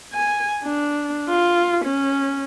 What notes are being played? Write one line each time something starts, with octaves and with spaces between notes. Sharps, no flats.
G#5
D4
F4
C#4